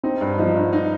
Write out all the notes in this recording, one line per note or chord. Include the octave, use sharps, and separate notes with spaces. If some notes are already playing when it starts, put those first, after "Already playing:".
C4 D#4
G2
F3 D#4
G2
D#4